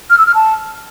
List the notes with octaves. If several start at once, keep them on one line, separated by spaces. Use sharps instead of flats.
F6
E6
F6
A5